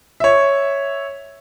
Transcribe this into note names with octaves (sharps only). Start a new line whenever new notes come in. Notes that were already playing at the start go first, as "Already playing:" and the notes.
C#5 E5